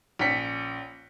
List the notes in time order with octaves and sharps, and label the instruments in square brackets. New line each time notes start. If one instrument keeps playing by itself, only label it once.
[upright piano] A#1 C#4 B6 C#7